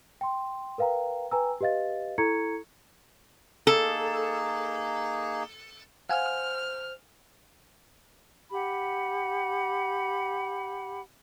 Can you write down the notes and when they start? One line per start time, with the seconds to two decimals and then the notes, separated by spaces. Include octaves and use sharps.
0.21 G5 C6
0.78 A#4 B4 F5 G5 A#5
1.31 B4 G5 G#5 A#5 E6
1.61 G4 B4 D#5 F5 A6
2.18 E4 A4 A#5 C#6 G#6 C#7
3.67 A#3 D#4 G#4 A4
6.09 C5 F5 F#5 G#5 F6
8.52 G4 F#5 B5